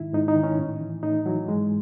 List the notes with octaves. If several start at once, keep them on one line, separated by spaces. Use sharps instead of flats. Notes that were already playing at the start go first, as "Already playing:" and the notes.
Already playing: G#2 D#3 E4
G#2 D#4
D#4
D#3
C#4
A2
E3
A2 D#4
E3 F#3
G#2 G#3